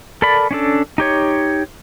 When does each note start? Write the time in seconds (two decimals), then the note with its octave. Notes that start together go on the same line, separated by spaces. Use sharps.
0.22 A4 A#4 D5 B5
0.51 C#4 D4 A4
0.98 D#4 G4 C#5